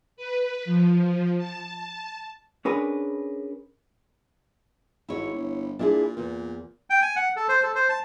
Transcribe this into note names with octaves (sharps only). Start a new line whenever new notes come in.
B4
F3
A5
C#4 D4 G#4 A#4 B4
G#1 E4 C#5
G1
A#2 D4 E4 G#4
E2 A#2
G5
G#5
F#5
A4
C5
A4
C5
A5